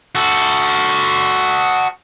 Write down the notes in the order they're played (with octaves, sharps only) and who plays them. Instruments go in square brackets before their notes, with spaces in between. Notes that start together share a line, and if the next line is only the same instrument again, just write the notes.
[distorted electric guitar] F#4 A4